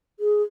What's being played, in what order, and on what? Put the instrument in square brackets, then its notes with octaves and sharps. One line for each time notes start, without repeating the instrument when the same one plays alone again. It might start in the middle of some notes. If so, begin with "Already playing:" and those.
[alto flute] G#4